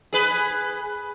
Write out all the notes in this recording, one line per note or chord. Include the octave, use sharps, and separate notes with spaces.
G#4 B4